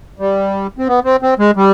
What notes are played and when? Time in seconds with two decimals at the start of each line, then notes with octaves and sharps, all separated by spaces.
0.19 G3
0.79 C4
0.88 B3
1.05 C4
1.22 C4
1.39 G#3
1.56 G3